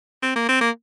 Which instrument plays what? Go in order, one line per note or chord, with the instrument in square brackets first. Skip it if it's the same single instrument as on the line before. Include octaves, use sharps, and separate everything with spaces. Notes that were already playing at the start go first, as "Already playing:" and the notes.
[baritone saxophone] C4
A#3
C4
A#3